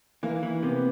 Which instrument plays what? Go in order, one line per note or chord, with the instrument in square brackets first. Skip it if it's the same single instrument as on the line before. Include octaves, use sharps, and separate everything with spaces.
[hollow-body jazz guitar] E3 [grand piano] A#3
[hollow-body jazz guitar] E3
[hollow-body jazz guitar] C3 [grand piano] B3